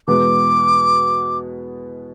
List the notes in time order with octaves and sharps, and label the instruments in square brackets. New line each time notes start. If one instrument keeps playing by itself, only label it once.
[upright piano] E2 B2 G#3 B3 [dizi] D6